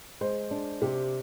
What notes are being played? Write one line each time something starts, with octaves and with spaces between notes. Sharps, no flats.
G#3 C5
D4
C3 G4